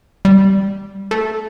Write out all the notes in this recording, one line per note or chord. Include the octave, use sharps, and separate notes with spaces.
G3
A3